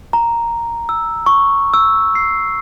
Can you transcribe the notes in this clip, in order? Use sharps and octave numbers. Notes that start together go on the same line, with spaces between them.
A#5
E6
C#6
E6
C7